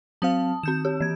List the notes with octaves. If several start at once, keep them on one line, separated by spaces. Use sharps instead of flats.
F#3 C4 F5 A5 D#6
D#3 C4 G6 E7
G4
E3 G#6